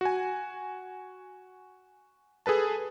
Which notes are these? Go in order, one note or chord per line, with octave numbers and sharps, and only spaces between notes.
F#4 G#5
G#4 A4 B4 A5